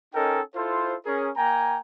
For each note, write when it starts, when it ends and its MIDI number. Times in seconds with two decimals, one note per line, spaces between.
0.14 0.41 61
0.14 0.41 63
0.14 0.41 69
0.14 0.41 70
0.14 0.41 75
0.14 0.41 79
0.55 0.95 64
0.55 0.95 65
0.55 0.95 69
0.55 0.95 72
1.06 1.29 61
1.06 1.29 68
1.06 1.29 70
1.37 1.78 58
1.37 1.78 79
1.37 1.78 80
1.37 1.78 82